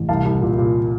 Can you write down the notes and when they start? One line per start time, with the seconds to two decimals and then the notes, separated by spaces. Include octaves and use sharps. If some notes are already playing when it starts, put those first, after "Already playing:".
Already playing: A1
0.09 C2 F5 A5
0.25 C2
0.42 A#2
0.58 A#2